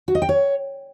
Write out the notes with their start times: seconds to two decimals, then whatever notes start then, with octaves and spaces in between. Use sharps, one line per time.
0.08 F#4
0.15 D#5
0.22 G5
0.29 C#5